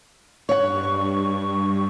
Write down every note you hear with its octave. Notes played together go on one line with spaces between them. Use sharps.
G2 C#5 F#5 C#6